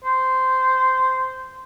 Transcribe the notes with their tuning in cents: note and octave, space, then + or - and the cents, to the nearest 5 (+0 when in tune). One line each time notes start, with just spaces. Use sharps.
C5 -10